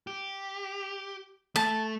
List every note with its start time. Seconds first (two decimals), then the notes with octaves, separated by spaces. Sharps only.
0.07 G4
1.56 A3 A5